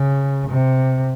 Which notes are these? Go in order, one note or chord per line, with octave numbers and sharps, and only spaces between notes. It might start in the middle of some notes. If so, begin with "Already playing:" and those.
Already playing: C#3
C3